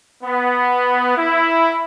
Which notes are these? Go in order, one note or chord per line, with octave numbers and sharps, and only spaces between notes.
B3
E4